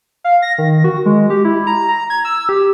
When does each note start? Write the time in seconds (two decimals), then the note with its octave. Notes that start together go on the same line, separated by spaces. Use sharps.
0.24 F5
0.42 A#6
0.58 D#3
0.84 F#4
1.06 G#3
1.30 G4
1.45 E4
1.67 A#5
1.88 A#5
2.10 G#6
2.25 E6
2.49 G4